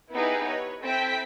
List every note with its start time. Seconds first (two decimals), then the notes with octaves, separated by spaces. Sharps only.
0.13 B3 D#4 E4 G4 G#4 B4
0.46 B4 C#5
0.83 C4 E4 A4 G5 B6